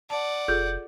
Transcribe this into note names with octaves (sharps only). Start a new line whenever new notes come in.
D5 F#5 A5
F1 F4 G#4 A4 G6